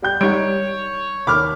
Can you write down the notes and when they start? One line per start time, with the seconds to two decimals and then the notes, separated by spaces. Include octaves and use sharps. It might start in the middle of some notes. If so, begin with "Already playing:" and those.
0.02 G3 G5 G6
0.21 G3 D#4 C#5 D7
1.27 D#2 B5 D6 F6